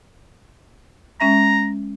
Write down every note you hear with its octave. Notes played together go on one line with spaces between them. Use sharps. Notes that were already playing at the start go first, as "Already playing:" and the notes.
G#3 C#4 E5 A#5